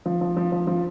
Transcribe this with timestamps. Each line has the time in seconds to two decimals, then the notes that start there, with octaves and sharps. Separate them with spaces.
0.06 F3
0.21 F3
0.37 F3
0.52 F3
0.67 F3